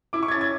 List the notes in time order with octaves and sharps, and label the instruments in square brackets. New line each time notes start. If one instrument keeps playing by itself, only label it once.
[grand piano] E4 D6
C#6
G#6
C#4 A6
G#6